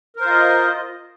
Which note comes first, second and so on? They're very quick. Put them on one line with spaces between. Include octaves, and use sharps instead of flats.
A#4 C5 F4 D#5